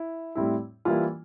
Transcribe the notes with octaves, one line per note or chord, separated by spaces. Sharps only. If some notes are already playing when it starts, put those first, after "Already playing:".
Already playing: E4
A2 G3 C4 E4
E3 G3 A#3 E4 F4